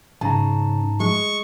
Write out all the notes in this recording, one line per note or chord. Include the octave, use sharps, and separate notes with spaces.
G#2 C#3 A5 A#5
G#3 C#6